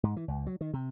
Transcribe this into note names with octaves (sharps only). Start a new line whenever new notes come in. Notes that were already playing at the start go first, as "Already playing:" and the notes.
G#2
E3
C#2
F#3
D#3
C3